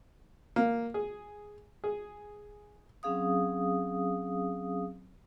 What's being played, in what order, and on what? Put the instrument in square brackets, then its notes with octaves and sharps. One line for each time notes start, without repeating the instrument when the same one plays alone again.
[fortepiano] A#3
G#4
G#4
[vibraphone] F#3 C4 C#4 G#4 F5 D#6